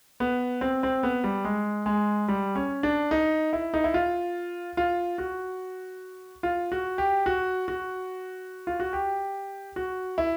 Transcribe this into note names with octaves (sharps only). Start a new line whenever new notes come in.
B3
C4
C4
B3
G3
G#3
G#3
G3
C#4
D4
D#4
E4
D#4
E4
F4
F4
F#4
F4
F#4
G4
F#4
F#4
F4
F#4
G4
F#4
E4